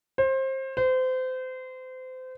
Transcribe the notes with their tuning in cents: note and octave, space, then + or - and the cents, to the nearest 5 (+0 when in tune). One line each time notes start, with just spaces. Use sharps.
C5 +25
C5 -30